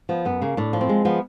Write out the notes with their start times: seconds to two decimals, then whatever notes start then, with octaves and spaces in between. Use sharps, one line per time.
0.09 F3 B3
0.25 F#2 B3
0.42 C#3 A#3
0.57 A2 D4
0.73 F3
0.81 C4
0.89 G#3
1.05 F3 B3